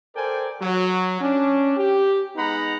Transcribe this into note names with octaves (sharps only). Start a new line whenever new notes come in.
A4 A#4 C5 D5 G5 G#5
F#3
C#4 D4
G4
G#3 B3 D#4 F#5 A#5 B5